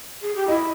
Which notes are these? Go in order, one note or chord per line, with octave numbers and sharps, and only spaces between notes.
G#4
G4
E4 D#5